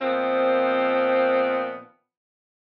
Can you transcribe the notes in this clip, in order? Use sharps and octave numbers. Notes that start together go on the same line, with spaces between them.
A#2 D#3 F3 B3 C4